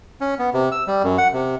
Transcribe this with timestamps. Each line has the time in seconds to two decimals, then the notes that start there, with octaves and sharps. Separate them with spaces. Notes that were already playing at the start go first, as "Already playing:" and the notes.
0.21 C#4
0.39 B3
0.54 C3
0.72 E6
0.87 G3
1.04 F#2
1.18 F#5
1.33 C3